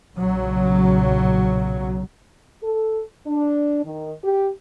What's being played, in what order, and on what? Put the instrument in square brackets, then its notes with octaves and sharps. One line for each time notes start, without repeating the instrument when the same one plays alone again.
[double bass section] B1 A#2 C#3 F#3
[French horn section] A4
D4
D#3
G4